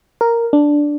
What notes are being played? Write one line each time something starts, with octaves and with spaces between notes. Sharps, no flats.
A#4
D4